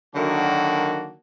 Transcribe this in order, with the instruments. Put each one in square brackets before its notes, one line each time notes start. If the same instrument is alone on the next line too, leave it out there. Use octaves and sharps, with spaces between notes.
[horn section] D3 D#3 F#3 A#3 D4 F#4